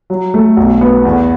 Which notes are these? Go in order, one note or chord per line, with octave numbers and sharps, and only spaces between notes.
F#3
A3
B1
B3
E2